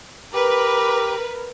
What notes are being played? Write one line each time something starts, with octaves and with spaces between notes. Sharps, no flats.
G4 A#4 B4 D6